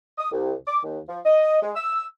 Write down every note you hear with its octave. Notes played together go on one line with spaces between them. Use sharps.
D#6
C2
D6
D#2
F3
D#5
G#3
E6